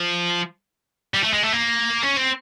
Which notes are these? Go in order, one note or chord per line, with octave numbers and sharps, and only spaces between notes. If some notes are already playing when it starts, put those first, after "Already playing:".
Already playing: F3
G3
A3
G#3
A3
A#3
C#4
C4